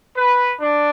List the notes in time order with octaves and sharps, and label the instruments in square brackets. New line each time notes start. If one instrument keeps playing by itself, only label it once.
[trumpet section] B4
D4